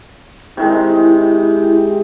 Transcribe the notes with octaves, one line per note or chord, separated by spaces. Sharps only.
C3 D#3 G#3 E4